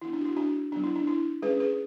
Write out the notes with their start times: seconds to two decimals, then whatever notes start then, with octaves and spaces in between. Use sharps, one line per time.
0.02 E3 B3 D4 E4
0.13 D4
0.21 F#4
0.25 E4
0.37 D4 F#4
0.72 F#3 B3 D4
0.84 E4
0.96 D4
1.07 E4
1.42 G#3 C#4 G#4 B4
1.60 G#4 B4